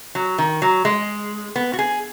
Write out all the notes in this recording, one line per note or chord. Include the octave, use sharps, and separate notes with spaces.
F#3
D#3
F#3
G#3
B3
F#4
G#4